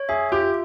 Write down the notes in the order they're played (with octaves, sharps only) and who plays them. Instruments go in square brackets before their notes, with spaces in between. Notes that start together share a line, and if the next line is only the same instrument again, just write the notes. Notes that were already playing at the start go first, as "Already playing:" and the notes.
Already playing: [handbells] C#5
[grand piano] G#4 [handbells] E5
[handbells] F4 [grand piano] G4